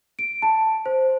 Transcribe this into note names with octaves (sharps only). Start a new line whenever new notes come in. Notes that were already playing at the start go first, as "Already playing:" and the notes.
D7
A5
C5